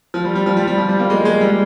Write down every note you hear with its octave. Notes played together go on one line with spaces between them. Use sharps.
F3
G3
G3
F3
G3
G3
F3
G3
A#3
G#3
G#3
G3